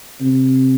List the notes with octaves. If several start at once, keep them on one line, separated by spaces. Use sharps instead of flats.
C3